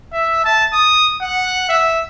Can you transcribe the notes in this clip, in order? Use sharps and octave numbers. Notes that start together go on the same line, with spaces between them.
E5
A5
D#6
F#5
E5